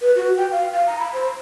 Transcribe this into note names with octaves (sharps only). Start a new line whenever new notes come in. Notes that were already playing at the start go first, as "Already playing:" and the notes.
B4
F#4
G5
F5
F5
A#5
B5
C5